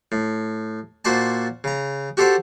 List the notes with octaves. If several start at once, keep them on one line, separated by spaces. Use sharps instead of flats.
A2
A#2 F#4 C5 D5 A5
C#3 A#5
F#4 G4 A4 C5 D5 F#5